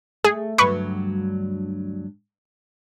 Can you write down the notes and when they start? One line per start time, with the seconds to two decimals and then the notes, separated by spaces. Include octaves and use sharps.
0.24 A3 G#4
0.58 D2 G2 F#3 B4 C#6